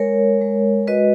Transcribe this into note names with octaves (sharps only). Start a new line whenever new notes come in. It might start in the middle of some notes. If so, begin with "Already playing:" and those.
Already playing: G#3 A#4 C#5
G#3
F#4 B4 D#5